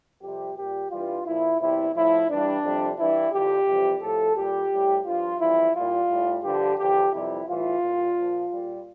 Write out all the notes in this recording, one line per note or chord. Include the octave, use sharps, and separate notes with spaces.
F2 C3 G3 G4
A#2 G3 G4
G2 E3 G3 F4
A#2 F3 E4
E2 C3 G3 E4
A2 F3 E4
G2 E3 G3 D4
F2 C3 G3
G2 E3 G3 E4
F2 D3 F3 G4
F2 C3 E3 G3
A2 F3 A4
A#2 G3 G4
A2 G3
G2 F3 F4
F2 E3 G3 E4
A#2 G3 F4
A2 G3
G2 D3 F3 G4
E2 D3 F3 G4
F2 C3 E3 G3 E4
A2 E3 G3 F4
A#2 G3
A#2 F3
A#2 G3